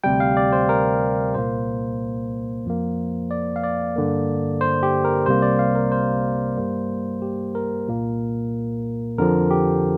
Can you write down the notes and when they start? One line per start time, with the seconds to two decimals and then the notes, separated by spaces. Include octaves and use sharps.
0.04 D2 C3 G3 G5
0.20 F5
0.37 D5
0.52 C5
0.69 A#4
1.34 C2 A#2 A#3 C5
2.65 F2 F3 A#3
3.31 D5
3.56 F5
3.63 D5
3.96 G2 D3 A#3
4.61 C5
4.83 G4
5.04 A#4
5.26 C2 C3 G3 A#3 C5
5.42 D5
5.59 F5
5.75 A#4
5.92 C5
6.57 G2 G3 A#3
7.22 G4
7.55 A#4
7.88 C2 A#2 A#3
9.18 F2 D3 F3 A#4
9.51 G4